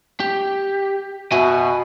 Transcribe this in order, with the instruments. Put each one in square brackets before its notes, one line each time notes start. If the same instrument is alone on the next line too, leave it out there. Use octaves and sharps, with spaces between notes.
[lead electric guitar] G4
[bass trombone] B2 [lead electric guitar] F#4 G#5 [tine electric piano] E5